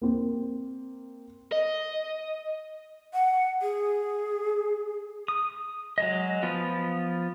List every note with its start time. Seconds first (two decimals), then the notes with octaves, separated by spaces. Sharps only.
0.02 A#3 C4
1.52 D#5
3.13 F#5
3.62 G#4
5.28 D#6
5.98 F#3 G#3 D#5
6.43 F3 B3 F4